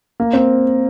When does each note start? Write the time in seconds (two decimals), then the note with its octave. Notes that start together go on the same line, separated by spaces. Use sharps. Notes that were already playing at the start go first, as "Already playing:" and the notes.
0.20 A#3
0.33 C4